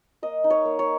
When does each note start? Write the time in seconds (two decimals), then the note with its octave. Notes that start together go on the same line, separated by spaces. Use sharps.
0.22 A#3 D#5
0.44 D#4
0.50 C#5
0.65 A#3
0.79 C#5